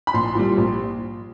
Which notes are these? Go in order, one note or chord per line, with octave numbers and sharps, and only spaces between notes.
B5
A#1 C6
A#2 G3
A#1